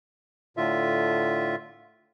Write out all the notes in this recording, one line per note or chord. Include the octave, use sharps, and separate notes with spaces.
A2 D3 F4 E5